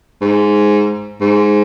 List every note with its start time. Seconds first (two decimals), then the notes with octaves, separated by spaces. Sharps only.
0.22 G#2
1.21 G#2